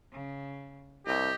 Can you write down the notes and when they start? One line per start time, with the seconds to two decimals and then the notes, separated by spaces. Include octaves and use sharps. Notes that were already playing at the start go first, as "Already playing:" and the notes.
0.13 C#3
1.07 C2 G4 D#5